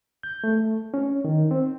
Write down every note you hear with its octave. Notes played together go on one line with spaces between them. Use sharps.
G6
A3
C#4
D#3
C4